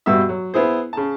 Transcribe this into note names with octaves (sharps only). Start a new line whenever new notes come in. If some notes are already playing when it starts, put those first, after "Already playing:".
G2 B2 F#4 E5 E6
F#3
B3 E4 G#4 C5
C#3 A5